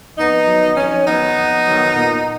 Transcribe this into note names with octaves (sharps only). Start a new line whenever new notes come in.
F2 B3 D#4
D#3 F#3
F2 C#4
D#3 F#3 B3 D#4
F2
D#3 F#3
A#2